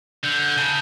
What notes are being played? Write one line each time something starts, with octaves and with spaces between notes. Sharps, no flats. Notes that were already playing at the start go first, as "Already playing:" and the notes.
D3 G6
G6
C#3 A5